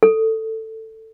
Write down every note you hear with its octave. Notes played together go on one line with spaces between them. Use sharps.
A4